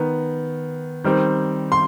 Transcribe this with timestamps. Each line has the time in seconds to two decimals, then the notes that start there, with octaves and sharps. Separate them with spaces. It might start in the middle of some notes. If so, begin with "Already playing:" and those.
Already playing: D#3 B3
1.04 D#3 G3 C4
1.72 C6